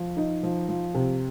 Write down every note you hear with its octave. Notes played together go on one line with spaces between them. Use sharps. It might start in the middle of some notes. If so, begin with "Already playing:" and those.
Already playing: F3
D#4
F3
F3
C3